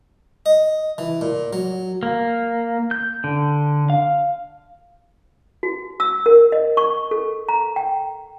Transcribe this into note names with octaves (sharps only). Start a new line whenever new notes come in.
D#5
E3
A#2
F#3
A#3
G6
D3
F5
F#4
E6
A#4
D#5
C#6
A4
A#5
G5